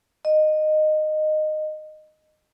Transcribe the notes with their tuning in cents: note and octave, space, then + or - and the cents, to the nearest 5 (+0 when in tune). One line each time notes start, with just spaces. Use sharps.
D#5 -15